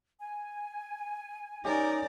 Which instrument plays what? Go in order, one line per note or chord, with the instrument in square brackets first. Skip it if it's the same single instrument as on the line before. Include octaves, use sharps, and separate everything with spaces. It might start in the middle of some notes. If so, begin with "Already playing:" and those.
[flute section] G#5
[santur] C#4 G4 D#5 [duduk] D#4 [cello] A#4 D5